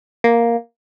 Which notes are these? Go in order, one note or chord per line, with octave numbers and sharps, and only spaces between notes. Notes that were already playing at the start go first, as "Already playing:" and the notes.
A#3